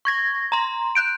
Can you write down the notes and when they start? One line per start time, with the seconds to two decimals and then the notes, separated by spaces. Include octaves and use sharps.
0.05 C#6 G#6 A#6
0.52 A#5 C6
0.95 F#6 G6 D7